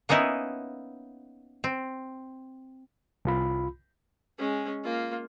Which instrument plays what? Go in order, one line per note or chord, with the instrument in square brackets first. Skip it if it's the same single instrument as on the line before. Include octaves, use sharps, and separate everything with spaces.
[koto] A#3 B3 C#4 D#4 E4
C4
[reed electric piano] C2 F4 B5
[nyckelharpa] G#3 C#4
A#3 F4